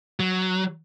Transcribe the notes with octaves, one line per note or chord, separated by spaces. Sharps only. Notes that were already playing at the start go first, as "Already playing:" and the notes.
F#3